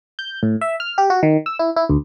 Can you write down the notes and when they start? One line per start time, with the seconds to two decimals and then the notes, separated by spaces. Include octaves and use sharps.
0.19 G6
0.43 A2
0.61 E5
0.80 F6
0.98 G4
1.10 F#4
1.23 D#3
1.46 E6
1.59 E4
1.76 E4
1.89 D2